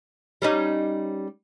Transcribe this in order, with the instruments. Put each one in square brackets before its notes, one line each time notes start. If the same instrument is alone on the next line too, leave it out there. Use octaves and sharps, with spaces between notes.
[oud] G3 C#4 D#4